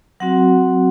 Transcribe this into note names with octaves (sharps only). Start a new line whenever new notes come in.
F#3 C4 F#4 F#5